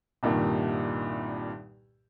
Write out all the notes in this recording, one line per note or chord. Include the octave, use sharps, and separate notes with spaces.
C2 G2 A#2 D#3